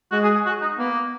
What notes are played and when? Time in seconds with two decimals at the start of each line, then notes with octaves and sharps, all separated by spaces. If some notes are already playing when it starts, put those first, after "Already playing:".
0.11 G#3 F#4
0.23 G#4
0.34 G#4
0.46 F#4
0.62 D#4
0.78 A#3 B3